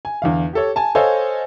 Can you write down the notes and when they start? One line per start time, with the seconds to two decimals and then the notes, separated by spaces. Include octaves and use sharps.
0.05 G#5
0.22 E2 D3 F5
0.53 G4 A4 C#5
0.76 G#5 A5
0.95 A4 C5 C#5 D#5 F5 G#5